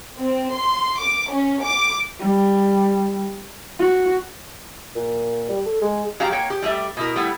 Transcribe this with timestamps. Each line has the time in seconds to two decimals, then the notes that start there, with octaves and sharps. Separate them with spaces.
0.19 C4
0.53 C6
1.00 D6
1.31 C#4
1.64 D6
2.20 G3
3.79 F#4
4.95 A#2
5.49 G3
5.66 A4
5.81 G#3
6.20 F#3 G4 D5 F5 A#5
6.32 A#3 C#5 G5
6.50 G4
6.62 G3 A3 G4 E5
6.97 B2 E4 A#4
7.16 G3 A3 B3 E4